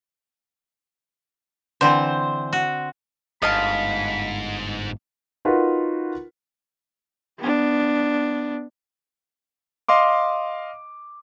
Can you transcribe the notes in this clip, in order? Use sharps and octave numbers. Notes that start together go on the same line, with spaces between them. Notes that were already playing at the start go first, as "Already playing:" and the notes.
D3 E3 C4 C5
F#4
G1 G#2 D#5 F5 A5 B5
D#4 F4 F#4 A#4 B4
B3 D4
D#5 F5 C6 D6